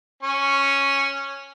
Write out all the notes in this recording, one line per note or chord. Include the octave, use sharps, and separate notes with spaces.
C#4 C#6